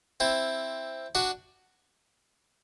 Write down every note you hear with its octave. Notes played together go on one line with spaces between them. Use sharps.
C4 E4
D4 F#4